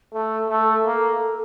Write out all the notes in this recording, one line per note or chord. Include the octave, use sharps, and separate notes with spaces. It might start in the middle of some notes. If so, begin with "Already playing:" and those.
A3 A4
A3
A#3